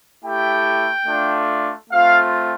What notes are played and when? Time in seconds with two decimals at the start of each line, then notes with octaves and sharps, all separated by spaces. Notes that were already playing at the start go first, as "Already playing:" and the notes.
0.23 A3 E4 G4 G5
1.05 A3 D4 F4
1.88 A3 C4 F4 F5